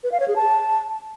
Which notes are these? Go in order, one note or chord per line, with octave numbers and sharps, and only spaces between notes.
B4
F5
C#5
G#4
A5